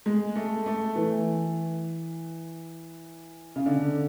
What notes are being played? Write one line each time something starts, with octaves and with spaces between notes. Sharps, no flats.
G#3
A3
A3
E3
C#3
D3